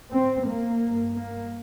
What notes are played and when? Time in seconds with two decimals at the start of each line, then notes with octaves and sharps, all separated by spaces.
0.12 C4
0.47 A#3
0.81 G2
1.15 A#3